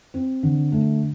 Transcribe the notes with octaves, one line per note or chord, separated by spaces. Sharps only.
C4
D3
A3